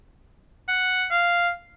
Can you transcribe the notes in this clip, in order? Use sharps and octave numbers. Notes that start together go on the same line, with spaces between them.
F#5
F5